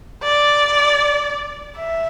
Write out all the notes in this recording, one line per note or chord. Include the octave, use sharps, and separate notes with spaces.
D5
E5